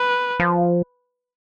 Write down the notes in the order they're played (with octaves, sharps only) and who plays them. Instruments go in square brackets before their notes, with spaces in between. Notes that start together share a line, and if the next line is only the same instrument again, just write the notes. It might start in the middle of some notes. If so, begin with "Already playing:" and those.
Already playing: [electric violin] B4
[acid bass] F3